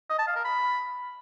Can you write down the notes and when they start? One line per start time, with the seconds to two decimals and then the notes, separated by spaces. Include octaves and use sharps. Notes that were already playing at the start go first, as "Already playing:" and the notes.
0.10 D#5
0.19 A5
0.27 F5
0.36 A#4
0.45 B5